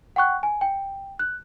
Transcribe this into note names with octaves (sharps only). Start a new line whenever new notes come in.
F#5 G5 C#6 F#6
G#5
G5
F#6